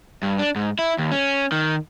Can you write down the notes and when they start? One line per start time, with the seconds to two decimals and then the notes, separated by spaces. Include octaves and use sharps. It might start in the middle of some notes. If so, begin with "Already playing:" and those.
0.23 G2
0.39 D4
0.56 G#2
0.79 E4
0.98 D#2
1.12 C#4
1.52 D#3